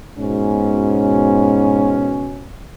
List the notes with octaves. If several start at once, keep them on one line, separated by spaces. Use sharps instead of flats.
G#2 B2 C#4